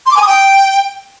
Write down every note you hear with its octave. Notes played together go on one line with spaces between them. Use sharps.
C6
D6
G#5
D#6
G5